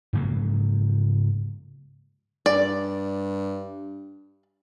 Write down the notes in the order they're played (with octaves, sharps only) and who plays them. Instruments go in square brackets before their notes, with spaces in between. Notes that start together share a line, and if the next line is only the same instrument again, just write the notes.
[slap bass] G#2 C#3 F#3 A#3
[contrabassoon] G2 [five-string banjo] D5